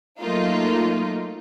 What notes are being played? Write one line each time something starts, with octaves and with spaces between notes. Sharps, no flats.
F#3 A3 A#3 D#4 F4